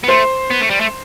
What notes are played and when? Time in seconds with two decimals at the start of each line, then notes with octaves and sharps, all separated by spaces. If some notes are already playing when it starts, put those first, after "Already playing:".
0.04 B3
0.08 A3 C5 C6
0.50 B3
0.61 A3
0.70 G3
0.80 A3